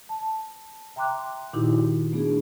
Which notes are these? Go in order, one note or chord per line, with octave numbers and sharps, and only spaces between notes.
A5
E5 G5 A#5 C6 D6 F#6
A#2 D#3 D#4 E4 F#4 G4
A3 B3 D4 G#4